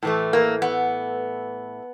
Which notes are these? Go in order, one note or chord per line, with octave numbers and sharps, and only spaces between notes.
A2 E3 A3
A#3
B3